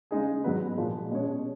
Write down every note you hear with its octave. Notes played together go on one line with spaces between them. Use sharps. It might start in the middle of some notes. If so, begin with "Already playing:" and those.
C#3 G#3 D#4 G#4
G#2 F#3 B3 F#4 B4
A#2 F3 G#3
B2 G#3 C#4 G#4 C#5